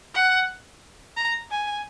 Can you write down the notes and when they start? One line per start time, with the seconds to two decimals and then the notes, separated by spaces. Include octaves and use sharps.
0.14 F#5
1.17 A#5
1.51 G#5